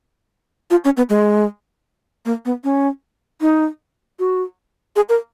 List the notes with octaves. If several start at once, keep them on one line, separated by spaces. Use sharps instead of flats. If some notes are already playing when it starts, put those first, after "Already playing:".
F4
C#4
B3
G#3
A#3
B3
C#4
D#4
F#4
G#4
A#4